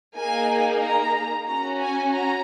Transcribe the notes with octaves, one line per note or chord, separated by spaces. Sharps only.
A#3 D#4 G#4 G#5
A#5
C#4 F#4 A#5
G#5
A#5